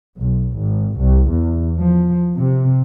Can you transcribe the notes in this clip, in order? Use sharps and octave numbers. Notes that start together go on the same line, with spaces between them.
B1
G#1
C2
E2
F3
C3